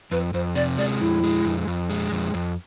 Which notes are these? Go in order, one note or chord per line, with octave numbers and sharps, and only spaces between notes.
F2 B4
F2 C5
C3 D5
G#3 D5
F2 E4
G#3
F2
F2
G#3
F2
F2